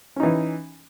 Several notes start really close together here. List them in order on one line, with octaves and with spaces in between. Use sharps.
C#4 D#4 E3